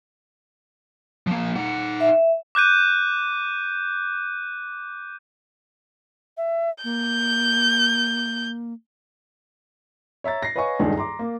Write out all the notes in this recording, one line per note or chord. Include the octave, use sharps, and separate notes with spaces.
F3 A#3
D#4 F#5
E5
D6 F#6 G6 D#7
E5
A#3 G6
C#5 E5 A#5 A6
A#6 C7
B4 C#5 D#5 F5 G#5 C#6
D#1 C#2 G2 D4 D#4 G#4
A#5 C6 D6
A#3